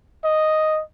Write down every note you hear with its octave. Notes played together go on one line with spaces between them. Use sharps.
D#5